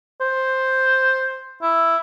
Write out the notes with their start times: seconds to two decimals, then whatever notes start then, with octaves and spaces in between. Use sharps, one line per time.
0.21 C5
1.62 E4